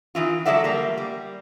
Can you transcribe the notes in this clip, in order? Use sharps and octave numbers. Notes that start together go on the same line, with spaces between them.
D#3 E3 F4
F#3 G#3 A4 D5 E5 F#5
G3 A#3
G3